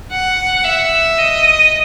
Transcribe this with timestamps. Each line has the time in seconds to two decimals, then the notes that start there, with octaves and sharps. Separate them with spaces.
0.11 F#5
0.64 E5
1.18 D#5